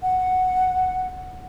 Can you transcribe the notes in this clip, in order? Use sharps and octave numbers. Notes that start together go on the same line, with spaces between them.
F#5